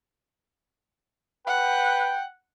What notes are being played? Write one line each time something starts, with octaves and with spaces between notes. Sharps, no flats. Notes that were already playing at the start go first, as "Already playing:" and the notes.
B4 F#5 G5